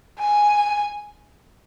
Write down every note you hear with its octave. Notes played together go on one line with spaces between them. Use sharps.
G#5